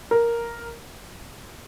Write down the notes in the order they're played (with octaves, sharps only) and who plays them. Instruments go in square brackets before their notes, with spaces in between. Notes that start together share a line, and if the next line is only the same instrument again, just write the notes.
[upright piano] A#4